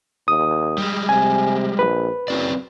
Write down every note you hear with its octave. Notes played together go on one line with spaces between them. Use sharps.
D#2 D#6
G3 G#3
C3 G#5
A#1 B4
F#1 F#3 C4 D5